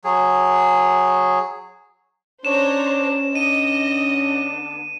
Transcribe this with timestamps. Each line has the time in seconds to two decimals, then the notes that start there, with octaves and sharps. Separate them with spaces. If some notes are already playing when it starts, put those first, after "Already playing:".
0.04 F#3 G#4
2.45 C#4 D4 C5 C#5 A#5 E7
3.35 D3 B3 D4 D#5 D#7